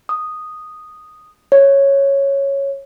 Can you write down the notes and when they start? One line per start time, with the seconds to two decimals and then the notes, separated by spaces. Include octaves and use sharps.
0.09 D#6
1.52 C#5